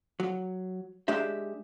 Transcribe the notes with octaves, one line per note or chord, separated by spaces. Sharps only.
F#3
G#3 D4 G4 E5